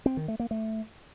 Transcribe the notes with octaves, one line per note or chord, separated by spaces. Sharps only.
C4
D#3
A3
A#3
A3